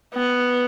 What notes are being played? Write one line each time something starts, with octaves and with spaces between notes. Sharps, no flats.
B3